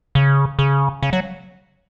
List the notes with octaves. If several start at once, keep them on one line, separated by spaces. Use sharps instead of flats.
C#3
C#3
C#3
F#3